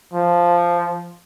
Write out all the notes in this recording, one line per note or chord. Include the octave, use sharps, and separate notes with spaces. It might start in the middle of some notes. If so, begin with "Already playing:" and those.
F3